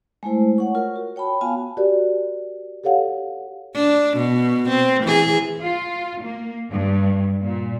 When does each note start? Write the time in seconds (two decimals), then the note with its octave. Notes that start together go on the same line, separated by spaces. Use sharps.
0.23 G#3 A3 E4 C5
0.58 C#5 F#5 C#6
0.75 F4 A#4
0.96 F#4
1.16 C#5 G5 A5 B5
1.41 B3 F4 F#4 F5 G#5 A5
1.77 F#4 G4 A#4 D5
2.84 G4 A4 C#5 F5 F#5
3.75 D4
4.17 B2
4.69 C4
5.04 E3 G#4
5.62 F4
6.22 A#3
6.72 G2
7.41 A#2